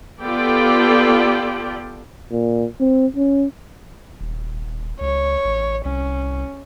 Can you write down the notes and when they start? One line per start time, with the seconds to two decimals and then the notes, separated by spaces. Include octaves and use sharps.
0.23 B3 F4 G4 A4 D5 G5
2.32 A#2
2.80 C4
3.16 C#4
4.21 D#1
5.01 C#2 C#5
5.45 A1
5.85 C2 C#4